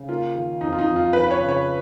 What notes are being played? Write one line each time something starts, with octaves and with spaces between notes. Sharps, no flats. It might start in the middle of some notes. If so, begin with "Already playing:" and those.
Already playing: C#3
A#3 F4
D#3
F2 D#4
F4
D#4
F2
F4
F3 B4
B4
C#5
C#3
C#5